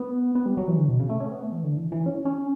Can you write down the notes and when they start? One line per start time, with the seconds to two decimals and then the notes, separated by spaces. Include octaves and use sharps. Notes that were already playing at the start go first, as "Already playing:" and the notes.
Already playing: B3
0.35 B3
0.46 G3
0.57 F#3
0.68 E3
0.78 D3
0.88 B2
0.99 C#3
1.09 A3
1.20 C#4
1.26 A3
1.31 B3
1.42 A3
1.52 E3
1.63 D3
1.77 E3
1.92 E3
2.06 C#4
2.25 C#4